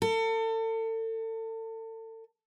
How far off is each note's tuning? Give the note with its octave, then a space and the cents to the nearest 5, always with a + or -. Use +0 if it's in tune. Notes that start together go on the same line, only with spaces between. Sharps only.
A4 +35